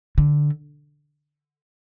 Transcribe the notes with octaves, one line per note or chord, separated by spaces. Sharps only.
D3